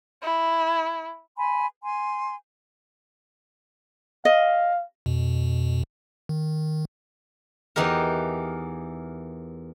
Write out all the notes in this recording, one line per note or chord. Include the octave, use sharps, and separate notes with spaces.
E4
G#5 B5 C6
G#5 C6
D#5 F5
F2 B2
D#3
E2 E3 D#4 G4 A#4